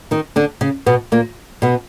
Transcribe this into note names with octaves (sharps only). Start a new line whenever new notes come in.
D#3 D#4
D3 D4
C#3 C#4
B2 B3
A#2 A#3
B2 B3